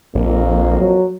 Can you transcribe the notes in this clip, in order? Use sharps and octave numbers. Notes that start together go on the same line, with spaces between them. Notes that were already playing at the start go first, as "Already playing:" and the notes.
A#1 F2 A#3
F#3